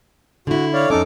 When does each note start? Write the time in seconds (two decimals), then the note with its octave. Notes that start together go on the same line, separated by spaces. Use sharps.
0.47 D3 E4 F#4
0.73 C#5 D5 F5
0.90 F2 C#4 D#4 A4 D6